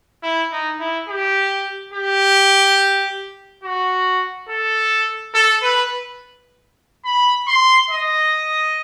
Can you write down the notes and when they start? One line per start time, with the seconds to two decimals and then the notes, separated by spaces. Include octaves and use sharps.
0.23 E4
0.52 D#4
0.80 E4
1.09 G4
1.93 G4
3.63 F#4
4.49 A4
5.35 A4
5.62 B4
7.05 B5
7.48 C6
7.90 D#5